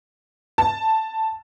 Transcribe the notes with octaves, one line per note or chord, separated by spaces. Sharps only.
A5